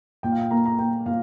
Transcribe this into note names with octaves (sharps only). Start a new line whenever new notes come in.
A#2 G5
F5
G5
A#3 A#5
A#5
A#3 G5
A#2 F5